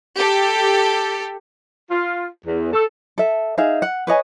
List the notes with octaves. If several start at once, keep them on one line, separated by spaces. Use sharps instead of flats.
G4 A4
F4
E2
A4
A4 E5
D#4 G#4 E5 F5
F#5
B4 C#5 D#5 G#5